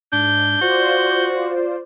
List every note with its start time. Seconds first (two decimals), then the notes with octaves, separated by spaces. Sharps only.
0.13 G#2 D4 G6
0.61 F4 F#4 C5 D5